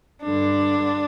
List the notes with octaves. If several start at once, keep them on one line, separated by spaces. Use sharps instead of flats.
G2 D3 D4